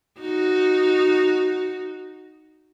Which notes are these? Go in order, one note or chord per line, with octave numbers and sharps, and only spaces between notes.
D#4 F#4